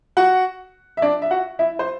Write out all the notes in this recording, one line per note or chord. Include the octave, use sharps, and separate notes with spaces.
F#4 F#5
E5
D4 D5
E5
F#4 F#5
E4 E5
C5